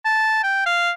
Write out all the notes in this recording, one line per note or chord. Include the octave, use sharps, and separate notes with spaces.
A5
G5
F5